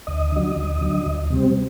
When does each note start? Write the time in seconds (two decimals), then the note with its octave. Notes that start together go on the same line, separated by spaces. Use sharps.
0.07 D2 D#5
0.32 D3 F#3
0.56 D2
0.81 D3 F#3
1.06 D2
1.30 C3 G3 C4